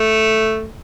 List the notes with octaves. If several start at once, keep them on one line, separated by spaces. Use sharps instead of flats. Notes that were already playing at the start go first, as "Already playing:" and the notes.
Already playing: A3